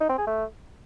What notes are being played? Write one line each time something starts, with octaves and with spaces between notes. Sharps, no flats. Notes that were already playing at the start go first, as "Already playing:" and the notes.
D#4
C4
G#4
A3